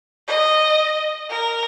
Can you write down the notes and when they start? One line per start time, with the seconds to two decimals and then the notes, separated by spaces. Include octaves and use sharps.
0.27 D#5
1.30 A#4